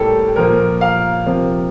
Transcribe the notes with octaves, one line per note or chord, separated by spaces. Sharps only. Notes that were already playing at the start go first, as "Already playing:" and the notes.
Already playing: A2 G3 A#3 G4 A4
A#2 F3 A#3 A#4
F5
C3 F3 A#3